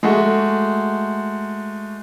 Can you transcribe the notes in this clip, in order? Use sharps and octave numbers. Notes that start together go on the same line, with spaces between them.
G#3 A3 F#4